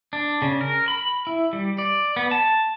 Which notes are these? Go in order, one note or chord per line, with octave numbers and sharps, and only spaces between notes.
D4
C#3
A#4
B5
E4
G3
D5
B3
A5